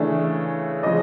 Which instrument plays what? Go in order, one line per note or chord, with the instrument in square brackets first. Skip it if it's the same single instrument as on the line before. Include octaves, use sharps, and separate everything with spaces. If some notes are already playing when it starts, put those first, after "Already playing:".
Already playing: [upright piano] C#3 E3 A3 D4
C#3 F3 G#3 D#5